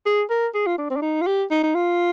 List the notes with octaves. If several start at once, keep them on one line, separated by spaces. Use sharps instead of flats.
G#4
A#4
G#4
F4
D4
C4
D4
D#4
F4
G4
D#4
D#4
F4